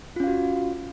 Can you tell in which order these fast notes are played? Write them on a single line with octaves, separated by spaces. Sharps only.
F4 C#4 F5 F#4